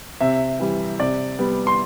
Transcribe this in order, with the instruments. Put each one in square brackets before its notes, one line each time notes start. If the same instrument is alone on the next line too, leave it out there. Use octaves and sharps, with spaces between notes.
[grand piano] C3 E5
E3 G3
C3 D5
G3 B3
C6